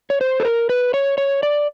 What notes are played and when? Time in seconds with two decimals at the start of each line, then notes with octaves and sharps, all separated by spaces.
0.10 C#5
0.21 C5
0.40 A4
0.45 A#4
0.69 B4
0.94 C#5
1.18 C#5
1.43 D5